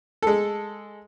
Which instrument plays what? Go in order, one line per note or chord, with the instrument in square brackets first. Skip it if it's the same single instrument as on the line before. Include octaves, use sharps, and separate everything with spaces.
[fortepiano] G#3 A4